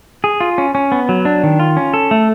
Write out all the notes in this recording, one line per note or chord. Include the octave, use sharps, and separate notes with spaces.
G#4
F4
C#4
C#4
B3
F#3
D4
D#3
F4
C#4
A4
A3